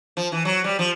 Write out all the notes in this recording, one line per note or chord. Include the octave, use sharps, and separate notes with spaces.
F3
E3
F#3
G3
F3